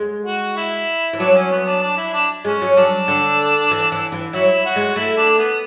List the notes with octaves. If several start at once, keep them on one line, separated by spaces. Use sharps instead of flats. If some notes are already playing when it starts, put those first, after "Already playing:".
Already playing: G#3
F#4
E4
E3
F#3 D4
C#4
B3
D4
D4
E4
D4
G#3 C#4
F#3
F#3 D4
D3
E3
E3
E3
F#3 E4
F#4
G#3
A3 E4
D4
B3